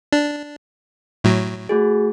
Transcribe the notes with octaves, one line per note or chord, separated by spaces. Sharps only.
D4
A2 F#3
A3 F#4 G#4